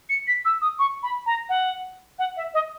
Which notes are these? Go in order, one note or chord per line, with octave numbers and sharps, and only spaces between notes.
C#7
B6
E6
D#6
C#6
B5
A#5
F#5
F#5
E5
D#5